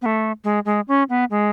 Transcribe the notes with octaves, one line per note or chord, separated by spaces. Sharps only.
B3
A3
G#3
G#3
C#4
B3
G#3